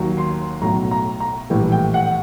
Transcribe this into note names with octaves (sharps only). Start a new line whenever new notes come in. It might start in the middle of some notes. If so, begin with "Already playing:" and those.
Already playing: D#2 D#3 F#3
C6
B1 A2 F#3 A#5
A#5
A#5
A#1 A2 E3 G3
G5
F#5